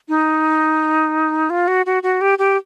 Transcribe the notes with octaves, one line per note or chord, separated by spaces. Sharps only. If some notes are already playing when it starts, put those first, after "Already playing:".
D#4
F4
F#4
F#4
F#4
G4
G4